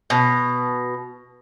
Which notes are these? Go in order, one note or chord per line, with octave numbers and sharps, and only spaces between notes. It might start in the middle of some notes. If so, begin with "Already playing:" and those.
B2